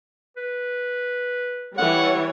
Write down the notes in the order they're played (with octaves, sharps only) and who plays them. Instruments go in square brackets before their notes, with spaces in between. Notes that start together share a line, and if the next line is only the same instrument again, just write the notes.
[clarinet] B4
[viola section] E3 G3 C#5 [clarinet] F#5